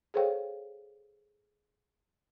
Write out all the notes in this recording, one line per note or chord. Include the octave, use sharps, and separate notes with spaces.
G#4 A4 C5 C#5 F5 G5